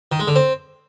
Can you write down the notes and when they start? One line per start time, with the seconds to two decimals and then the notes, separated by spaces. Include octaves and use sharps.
0.12 D#3
0.20 G#3
0.27 D3
0.35 C4